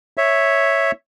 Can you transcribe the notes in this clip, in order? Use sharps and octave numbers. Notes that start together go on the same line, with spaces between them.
C#5 E5